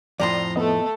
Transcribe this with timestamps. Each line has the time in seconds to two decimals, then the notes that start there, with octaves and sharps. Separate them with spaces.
0.20 F2 A2 F3 D5 A#5 C6
0.56 A3 B3 A4 D#5